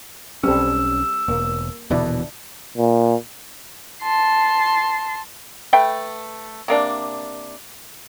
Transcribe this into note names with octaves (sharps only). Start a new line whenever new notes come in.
B1 G3 C4 C#4 A4 E6
E1 A#3
D#1 B2 D3 E3 D4 E4
A#2
A5 C6
A3 B4 E5 G5
C3 A#3 D4